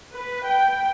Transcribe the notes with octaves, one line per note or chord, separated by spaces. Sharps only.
B4
G5